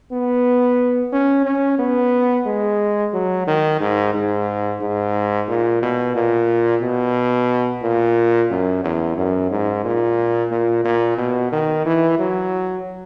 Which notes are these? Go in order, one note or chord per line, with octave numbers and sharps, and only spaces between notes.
B3
C#4
C#4
B3
G#3
F#3
D#3
G#2
G#2
G#2
A#2
B2
A#2
B2
A#2
F#2
E2
F#2
G#2
A#2
A#2
A#2
B2
D#3
E3
F#3